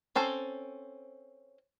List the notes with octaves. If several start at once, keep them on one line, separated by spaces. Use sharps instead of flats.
C4 C#4 A4 C5